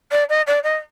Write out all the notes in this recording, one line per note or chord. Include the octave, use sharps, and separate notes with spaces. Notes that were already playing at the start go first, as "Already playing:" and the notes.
D5
D#5
D5
D#5